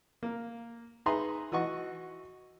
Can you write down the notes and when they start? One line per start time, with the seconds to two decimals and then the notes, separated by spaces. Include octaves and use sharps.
0.23 A#3
1.06 D#4 G#4 B4 E5 A#5 C6
1.52 E3 F#4 D#5 F#5 C#6